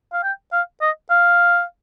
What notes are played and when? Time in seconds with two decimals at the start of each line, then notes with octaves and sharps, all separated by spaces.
0.12 F5
0.23 G5
0.53 F5
0.82 D#5
1.10 F5